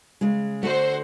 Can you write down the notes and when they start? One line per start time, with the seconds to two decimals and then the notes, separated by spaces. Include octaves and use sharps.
0.21 C#3 G#3
0.63 D3 A3 F#4 C5